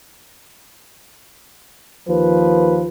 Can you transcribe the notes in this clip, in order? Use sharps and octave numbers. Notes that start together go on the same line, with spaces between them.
D#2 F3 B4